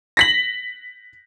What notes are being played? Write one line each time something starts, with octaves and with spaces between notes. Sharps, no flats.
A#6 B6 F#7